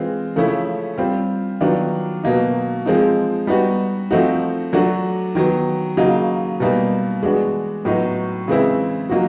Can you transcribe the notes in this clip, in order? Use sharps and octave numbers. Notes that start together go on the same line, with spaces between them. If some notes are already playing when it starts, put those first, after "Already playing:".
Already playing: E3 G#3 C4 F4
C#3 F3 A3 C#4 E4
G3 C4 F4
D#3 F#3 B3 D4 F4
B2 F#3 A#3 D#4
F3 G#3 C4 D#4
G3 B3 D#4 F#4
F3 A3 C4 D#4 F#4
F#3 A3 D4 F#4
D#3 F#3 B3
C#3 F#3 A#3 D#4 F#4
B2 G3 A#3 D#4
E3 G#3 B3 D4 F#4
A2 F#3 B3 D#4 F#4
C#3 E3 G#3 C4 E4
F#3 A#3 D#4 F#4